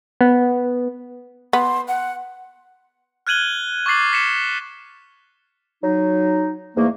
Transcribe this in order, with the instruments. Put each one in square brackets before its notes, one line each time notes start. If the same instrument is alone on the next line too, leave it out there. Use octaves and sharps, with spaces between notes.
[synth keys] B3
[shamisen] B3 [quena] C6
[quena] F#5
[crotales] F6 F#6 G#6 D#7 F#7 G7
C#6 D6 A6 C7 F#7
B6 C#7 E7
[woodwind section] F#3 D#4
E2 G#2 A3 A#3